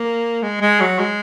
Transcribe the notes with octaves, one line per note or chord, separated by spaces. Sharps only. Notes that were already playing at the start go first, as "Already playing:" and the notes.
Already playing: A#3
G#3
G#3
F#3
G#3